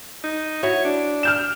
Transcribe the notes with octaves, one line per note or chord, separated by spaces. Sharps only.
D#4
E4 F#4 C#5
D4
F6 G6 E7